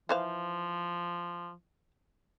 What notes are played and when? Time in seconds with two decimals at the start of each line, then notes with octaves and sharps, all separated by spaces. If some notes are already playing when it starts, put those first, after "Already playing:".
0.09 E3 F3 C5 F5